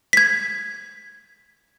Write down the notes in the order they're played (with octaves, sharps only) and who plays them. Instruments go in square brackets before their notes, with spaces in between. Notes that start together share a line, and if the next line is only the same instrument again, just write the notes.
[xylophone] G#6 B6